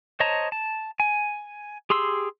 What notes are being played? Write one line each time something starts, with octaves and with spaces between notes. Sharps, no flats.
C5 C#5 D#5 A5 A#5
A5
G#5
G4 G#4 C6 E6